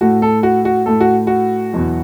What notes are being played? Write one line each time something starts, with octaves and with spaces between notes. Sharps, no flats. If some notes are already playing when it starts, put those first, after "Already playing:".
A2 A3 F#4
A4
F#4
F#4
A2 A3 A4
F#4
F#4
E2 B2 F#3